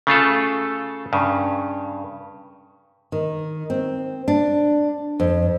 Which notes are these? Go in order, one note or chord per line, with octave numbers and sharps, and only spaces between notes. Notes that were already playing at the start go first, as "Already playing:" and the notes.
C#3 A3 F4 A4
G2 C#3
D#3
C4
D4
F2